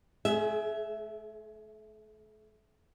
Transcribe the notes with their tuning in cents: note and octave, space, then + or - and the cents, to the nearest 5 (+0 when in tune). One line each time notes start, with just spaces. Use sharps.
A3 -40 G#4 +25 E5 +0